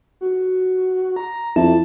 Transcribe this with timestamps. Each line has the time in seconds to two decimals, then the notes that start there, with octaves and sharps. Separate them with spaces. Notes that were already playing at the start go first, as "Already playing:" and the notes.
0.21 F#4
1.16 A#5
1.56 F2 E4 A5